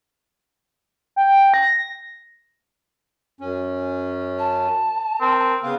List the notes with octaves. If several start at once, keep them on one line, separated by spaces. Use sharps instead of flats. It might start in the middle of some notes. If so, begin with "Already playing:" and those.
G5
A#6
F#2 C#4
A5
C4 A#4
C#3 B3 B4 F5